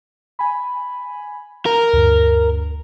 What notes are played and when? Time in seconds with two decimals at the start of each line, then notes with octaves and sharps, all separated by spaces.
0.39 G#5 B5
1.66 A#4
1.93 D2 G2